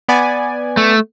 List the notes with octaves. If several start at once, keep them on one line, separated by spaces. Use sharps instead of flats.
B3 D5 G#5
A3